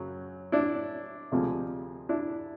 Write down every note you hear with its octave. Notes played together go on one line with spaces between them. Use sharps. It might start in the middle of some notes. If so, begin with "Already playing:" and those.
Already playing: F#2 C#3 F#3
D4 E4
D2 C3 F3 G#3
D4 E4